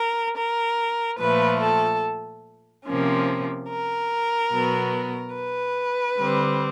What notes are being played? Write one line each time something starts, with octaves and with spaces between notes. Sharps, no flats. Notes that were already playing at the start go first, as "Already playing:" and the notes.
Already playing: A#4
A#4
A#2 F3 A3 B4
A4
C3 F3 A#3 C#4
A#4
B2 F#3 B3
B4
D3 G3 C4